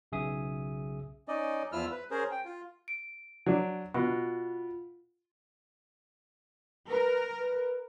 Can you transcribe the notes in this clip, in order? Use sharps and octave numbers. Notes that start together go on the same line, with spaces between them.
B1 C#3 G#4 E5 D#6
C#4 D#4 D5 D#5
E2 F3 E4 F4 E6 F6
B4
C#4 G#4 A#4 C5
G5
F4
D7
F#3 D4
B2 F4
A#4 B4
B4